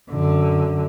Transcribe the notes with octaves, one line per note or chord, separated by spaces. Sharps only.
F#2 D3